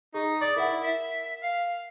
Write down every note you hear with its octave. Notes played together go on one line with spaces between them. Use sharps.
D#4 G#4
D5 D6 D#6
E4 A#4 F#5
E5
F5